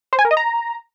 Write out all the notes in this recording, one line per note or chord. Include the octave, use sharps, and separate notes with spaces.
C5
G#5
A#4
D#5
A#5